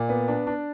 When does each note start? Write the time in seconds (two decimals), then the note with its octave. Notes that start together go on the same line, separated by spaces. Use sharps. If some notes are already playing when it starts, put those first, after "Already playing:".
Already playing: A#2 D5
0.09 B3
0.28 D4
0.47 D4